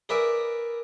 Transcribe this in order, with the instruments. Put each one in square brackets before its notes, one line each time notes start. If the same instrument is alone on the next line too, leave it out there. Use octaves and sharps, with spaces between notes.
[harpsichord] G#4 A#4 B4 D5 E5